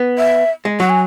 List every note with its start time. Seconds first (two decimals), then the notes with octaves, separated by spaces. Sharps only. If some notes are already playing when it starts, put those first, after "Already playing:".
Already playing: B3
0.18 E5
0.65 G#3
0.80 F#3 F#5
0.90 G#5